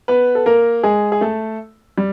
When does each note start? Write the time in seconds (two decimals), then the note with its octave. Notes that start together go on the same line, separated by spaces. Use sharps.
0.08 B3 B4
0.35 A4
0.46 A#3 A#4
0.83 G#3 G#4
1.12 G#4
1.21 A3 A4
1.98 G3